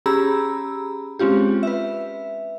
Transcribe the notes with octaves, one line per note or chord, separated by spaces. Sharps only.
C#4 G4 G#4 A#5 B5 E6
G#3 C4 C#4 F4 G4
B4 E5